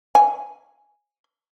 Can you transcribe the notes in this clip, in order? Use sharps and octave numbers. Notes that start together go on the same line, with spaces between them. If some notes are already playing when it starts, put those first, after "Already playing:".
G#5